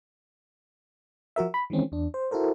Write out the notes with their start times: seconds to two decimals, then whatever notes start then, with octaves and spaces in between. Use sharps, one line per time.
1.36 F3 F#4 A#4 E5
1.54 B5
1.70 D#3 E3 G#3 C4 C#4
1.92 E2 D4
2.14 C5
2.31 E4 F#4 A4 A#4 C5